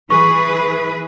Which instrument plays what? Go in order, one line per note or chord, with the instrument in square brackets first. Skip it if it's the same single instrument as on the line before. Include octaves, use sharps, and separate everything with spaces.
[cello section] E3 G#4 B4 [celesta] C#6